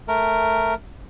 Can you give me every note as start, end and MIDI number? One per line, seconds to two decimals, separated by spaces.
0.08 0.74 57
0.08 0.74 70